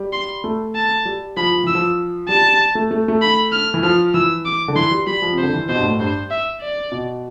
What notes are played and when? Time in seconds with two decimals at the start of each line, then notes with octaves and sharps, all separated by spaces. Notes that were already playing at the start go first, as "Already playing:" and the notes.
Already playing: G3
0.13 C6
0.44 A3
0.75 A5
1.05 G3
1.37 F3 B5
1.52 F3
1.64 E3 E6
1.75 F3
2.29 G3 A5
2.75 A3
2.91 A3
3.08 A3
3.22 B5
3.52 F6
3.74 E3
3.83 F3 F6
4.14 E3 E6
4.46 D6
4.68 D3
4.76 E3 C6
4.91 G3
5.07 G3 B5
5.22 F3
5.33 C3
5.38 C5
5.43 D3
5.53 E3
5.69 B2 C5
5.76 G2
5.84 A2
5.99 G2 C5
6.31 E5
6.61 D5
6.92 B2